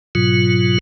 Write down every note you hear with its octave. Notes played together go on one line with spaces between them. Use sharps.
G#2 B2 F#3 F4